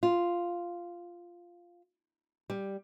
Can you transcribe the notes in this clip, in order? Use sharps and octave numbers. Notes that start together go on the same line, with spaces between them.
F4
G3